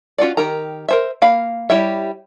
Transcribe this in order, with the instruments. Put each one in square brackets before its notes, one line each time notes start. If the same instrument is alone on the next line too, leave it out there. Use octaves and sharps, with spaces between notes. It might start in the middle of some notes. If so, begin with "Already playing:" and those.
[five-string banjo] C#4 F4 F#4 D5
D#3 G4 A#4 A#5
A#4 C5 E5
A#3 F5 B5
G3 E4 G4 C#5 E5